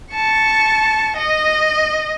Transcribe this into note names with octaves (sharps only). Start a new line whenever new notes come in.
A5 C#6
D#5